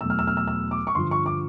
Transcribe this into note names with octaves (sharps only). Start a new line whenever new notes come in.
E2 B2 F#3 A3 E6
F6
E6
F6
E6
E6
D6
C#6
G2 D3 F3 C6
C#6
D6